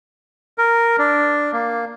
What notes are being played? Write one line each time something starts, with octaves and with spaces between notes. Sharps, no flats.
A#4
D4
A#3